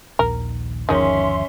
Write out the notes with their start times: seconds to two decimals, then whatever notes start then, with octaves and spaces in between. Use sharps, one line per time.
0.19 A#1 D#2 D#3 A#4
0.89 G1 D#2 D#3 F3 G#3 C#4 E5 C6